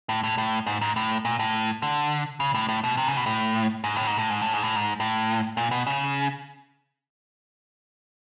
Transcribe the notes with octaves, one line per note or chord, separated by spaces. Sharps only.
A2
A2
A2
G#2
G#2
A2
A#2
A2
D3
C#3
A2
A2
B2
C3
C#3
B2
A2
G#2
A2
G#2
A2
G#2
A2
G#2
A2
G#2
A2
A#2
B2
C#3